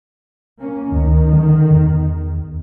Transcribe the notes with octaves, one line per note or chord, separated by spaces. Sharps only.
A#3 C#4
D2 D#3
D3
E2